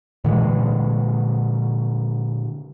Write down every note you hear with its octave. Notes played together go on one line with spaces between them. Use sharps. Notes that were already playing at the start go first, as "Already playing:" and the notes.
A#2 D3 E3 G#3